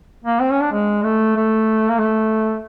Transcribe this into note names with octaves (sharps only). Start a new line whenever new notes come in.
A#3
C4
C#4
D4
G#3
A3
A3
A#3
A3